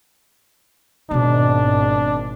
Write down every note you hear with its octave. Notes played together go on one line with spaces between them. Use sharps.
G#1 B2 B3 D4